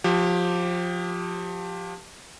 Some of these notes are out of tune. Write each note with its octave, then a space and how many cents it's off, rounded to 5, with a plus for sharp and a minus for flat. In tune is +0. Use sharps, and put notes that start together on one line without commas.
F3 +20 G4 +0